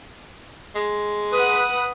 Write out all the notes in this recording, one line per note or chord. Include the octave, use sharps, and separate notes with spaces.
G#3
B4 F#5 D#6